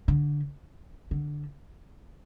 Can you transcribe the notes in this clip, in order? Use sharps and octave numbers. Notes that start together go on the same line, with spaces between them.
D3
D3